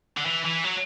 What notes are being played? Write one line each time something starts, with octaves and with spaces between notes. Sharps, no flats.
D3
E3
E3
F#3